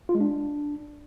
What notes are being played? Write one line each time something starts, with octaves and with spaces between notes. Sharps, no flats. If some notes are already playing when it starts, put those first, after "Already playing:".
F4
G#3
D4